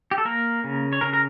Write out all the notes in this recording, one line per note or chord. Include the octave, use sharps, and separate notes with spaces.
G4
A4
A#3 A#4
C#3
C#5
C#3 A#4
A#4